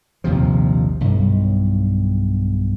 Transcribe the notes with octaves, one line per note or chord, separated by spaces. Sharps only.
A#1 D#2 C3 F3
B1 G2